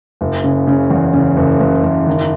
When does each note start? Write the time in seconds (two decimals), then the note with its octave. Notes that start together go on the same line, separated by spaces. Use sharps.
0.21 F#1
0.44 C#3
0.67 C#3
0.90 E2
1.14 C#3
1.37 F#1
1.60 F#1
1.83 F#1
2.07 D#3